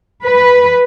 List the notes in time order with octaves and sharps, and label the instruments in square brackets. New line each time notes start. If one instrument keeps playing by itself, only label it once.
[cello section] B4